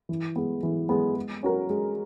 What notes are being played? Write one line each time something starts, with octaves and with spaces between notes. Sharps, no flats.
E3
G#3 B3
E3
G#3 B3
G#3
C#4 F#4 A#4
G#3